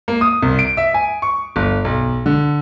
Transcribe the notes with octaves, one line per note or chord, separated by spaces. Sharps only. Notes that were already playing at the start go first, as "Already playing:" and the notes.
A#3
D#6
C2
D7
E5
G#5
C#6
G1
B1
D3